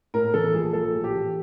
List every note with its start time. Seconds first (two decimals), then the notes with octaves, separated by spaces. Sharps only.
0.14 A2 A#4
0.33 E3 A4
0.53 A#1 G#4
0.73 A#1 A4
0.94 A2
1.04 G4
1.14 E3